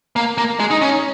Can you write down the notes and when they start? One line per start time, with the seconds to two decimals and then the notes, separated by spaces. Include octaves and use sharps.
0.16 A#3
0.38 A#3
0.60 G#3
0.71 D#4
0.82 C#4